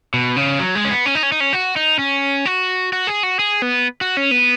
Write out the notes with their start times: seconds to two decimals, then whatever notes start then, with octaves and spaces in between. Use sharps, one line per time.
0.14 B2
0.36 C#3
0.59 F#3
0.75 G#3
0.85 C#4
0.91 B3
1.06 C#4
1.15 D#4
1.23 C#4
1.32 D#4
1.40 C#4
1.53 F#4
1.76 D#4
1.99 C#4
2.45 F#4
2.93 F#4
3.07 G#4
3.23 F#4
3.39 G#4
3.62 B3
4.01 F#4
4.17 C#4
4.31 B3